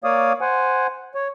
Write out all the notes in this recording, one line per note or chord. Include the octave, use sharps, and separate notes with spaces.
A#3 C#5 D5 F5 D#6
C5 F#5 G#5
C#5